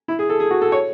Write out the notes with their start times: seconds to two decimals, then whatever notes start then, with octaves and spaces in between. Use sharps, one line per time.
0.08 E4
0.19 G#4
0.30 A4
0.40 G#4
0.50 F#4
0.62 A4
0.72 C#5